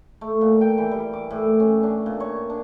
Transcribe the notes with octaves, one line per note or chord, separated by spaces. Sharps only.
A3
A#2
G5
E3
G3
D6
A2
C#4
D4
A#2
C#5
D4